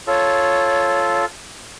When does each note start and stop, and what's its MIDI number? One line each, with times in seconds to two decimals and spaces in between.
0.07 1.25 65
0.07 1.25 69
0.07 1.23 73